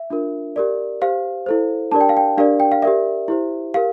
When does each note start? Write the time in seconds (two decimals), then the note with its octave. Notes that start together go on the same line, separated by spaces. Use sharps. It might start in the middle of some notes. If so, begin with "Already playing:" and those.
Already playing: E5
0.10 D4 F4 A#4
0.56 G4 A#4 D5
1.01 G4 C5 F5
1.46 E4 A4 C5
1.92 D4 G4 A#4 D5 A5
2.01 G5
2.09 F5
2.17 G5
2.37 D4 G4 A#4 D5 F5
2.60 G5
2.72 F5
2.82 G4 A#4 D5 E5
3.28 E4 G4 C5
3.74 G4 A#4 F5